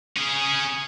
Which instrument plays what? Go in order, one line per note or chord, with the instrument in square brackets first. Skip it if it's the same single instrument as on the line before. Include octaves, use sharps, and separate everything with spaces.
[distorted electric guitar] C#4 G#4